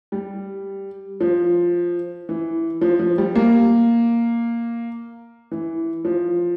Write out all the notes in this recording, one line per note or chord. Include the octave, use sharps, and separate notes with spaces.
G3
F3
E3
F3
F3
G3
A#3
E3
F3